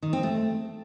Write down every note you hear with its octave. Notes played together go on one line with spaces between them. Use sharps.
D#3
C4
A3